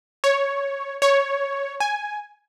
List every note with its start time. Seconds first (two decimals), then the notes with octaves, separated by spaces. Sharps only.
0.24 C#5
1.02 C#5
1.80 G#5